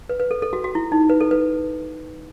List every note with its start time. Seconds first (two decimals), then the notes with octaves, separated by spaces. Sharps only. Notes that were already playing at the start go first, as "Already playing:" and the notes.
0.09 B4
0.20 B4
0.31 A4
0.42 A4
0.53 F#4
0.64 F#4
0.75 E4
0.92 D#4
1.10 B4
1.21 A4
1.31 B4